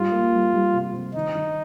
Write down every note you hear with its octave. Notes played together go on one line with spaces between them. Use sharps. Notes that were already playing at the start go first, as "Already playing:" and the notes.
Already playing: G#2 G3 F4
A#3
G3
G3
C3
C3
D#3 D#4
D#3